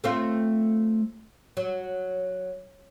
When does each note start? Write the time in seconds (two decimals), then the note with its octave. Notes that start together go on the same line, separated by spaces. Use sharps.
0.04 A3 C4 F4
1.57 F#3